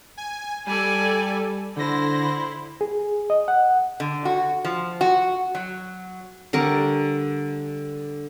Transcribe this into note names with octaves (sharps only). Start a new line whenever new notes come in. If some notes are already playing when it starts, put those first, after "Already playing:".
G#5
G3 A4 D5 G#5
D3 E4 C5 A#6
G#4
D#5
F#5
D3
F#4
F3
F#4
F#3
D3 G3 A#4 C#6